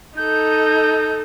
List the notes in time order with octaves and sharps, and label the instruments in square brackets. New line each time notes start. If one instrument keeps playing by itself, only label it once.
[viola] D#4 A4 [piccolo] G6